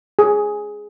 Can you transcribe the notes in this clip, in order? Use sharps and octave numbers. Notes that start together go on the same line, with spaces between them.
G#4